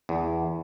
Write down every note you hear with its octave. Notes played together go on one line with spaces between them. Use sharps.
E2